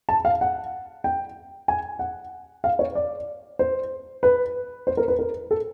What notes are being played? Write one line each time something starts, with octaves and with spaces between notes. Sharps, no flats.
A5
F5
F#5
G5
G#5
F#5
F5
C#5
D5
C5
B4
C5
A#4
B4
A#4
A4